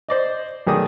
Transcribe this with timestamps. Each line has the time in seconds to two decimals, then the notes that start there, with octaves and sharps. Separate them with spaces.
0.09 C5 D5 D#5
0.67 B1 D#3 A3 G#4 D5 D#6